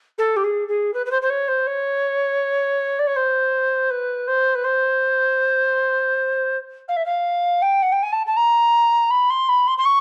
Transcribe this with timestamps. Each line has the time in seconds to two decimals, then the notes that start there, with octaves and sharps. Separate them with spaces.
0.18 A4
0.36 G4
0.43 G#4
0.68 G#4
0.93 B4
1.06 B4
1.11 C5
1.21 C5
1.30 C#5
1.48 C5
1.67 C#5
2.99 D5
3.06 C#5
3.16 C5
3.90 B4
4.27 C5
4.54 B4
4.64 C5
6.88 F5
6.96 E5
7.05 F5
7.62 G5
7.82 F#5
7.92 G5
8.02 G#5
8.12 A5
8.26 A5
8.36 A#5
9.10 B5
9.30 C6
9.49 B5
9.67 C6
9.78 C6
9.85 C#6